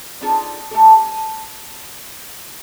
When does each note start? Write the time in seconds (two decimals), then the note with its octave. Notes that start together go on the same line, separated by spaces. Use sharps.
0.21 C4 D4 D#4 F4 G#4 A4
0.71 A3 G4 A4
1.04 G#5